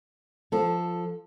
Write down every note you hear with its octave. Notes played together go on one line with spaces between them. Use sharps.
F3 A4